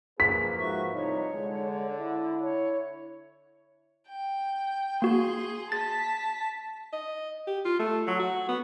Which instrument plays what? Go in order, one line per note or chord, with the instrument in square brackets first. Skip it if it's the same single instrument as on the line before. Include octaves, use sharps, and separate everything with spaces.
[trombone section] F3 A#3 B4 [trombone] G#4 [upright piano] B6
[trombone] G#2 [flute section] F#4 E5 C#6
[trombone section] C2 F3 [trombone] D#4 [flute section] C#5
[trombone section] D3 [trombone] G#3
[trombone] E4
[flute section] C#5
[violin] G5
[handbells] A#3 F#4 [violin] G#4 C6
[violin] A5 B6 [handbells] A6
[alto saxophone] D#5
G4
F4
A3
F#3
F#4
B3